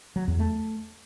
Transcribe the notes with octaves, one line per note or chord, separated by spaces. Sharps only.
F#3
E2
A3